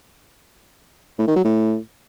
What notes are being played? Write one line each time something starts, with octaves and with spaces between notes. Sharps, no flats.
A2
D#3
F#3
A2